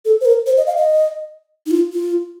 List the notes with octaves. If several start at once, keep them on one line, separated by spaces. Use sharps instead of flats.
A4
C5
A#4
C5
D#5
F5
D#5
D#4
F4
F4